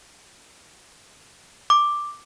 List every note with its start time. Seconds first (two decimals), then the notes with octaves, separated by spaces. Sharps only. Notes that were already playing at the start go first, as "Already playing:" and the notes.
1.70 D6